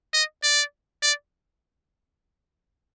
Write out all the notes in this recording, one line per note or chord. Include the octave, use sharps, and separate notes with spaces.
D#5
D5
D5